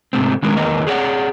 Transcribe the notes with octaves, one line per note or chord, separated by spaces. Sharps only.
G#2 C3 A3 C4
D#3 G#3 B3 C#4 D4 A#4
E2 D#3 A#3 A#4 B4 D#5
G#4 C#5 D5 F#5